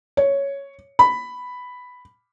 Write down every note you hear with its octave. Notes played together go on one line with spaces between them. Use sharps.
C#5
B5